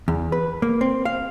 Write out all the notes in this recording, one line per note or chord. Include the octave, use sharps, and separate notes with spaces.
E2
B4
A#3
C4
F5